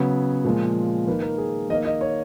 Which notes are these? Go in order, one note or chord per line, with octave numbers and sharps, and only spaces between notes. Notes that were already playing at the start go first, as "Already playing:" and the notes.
Already playing: C#3 F#3 B3 C#5
A#2 F3 G#3
D#3 A#3 B4
A#4
G#4
D#3 A#3 D#5
D#5
C#5